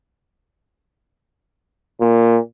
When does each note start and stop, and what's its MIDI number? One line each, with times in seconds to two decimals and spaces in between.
2.01 2.37 46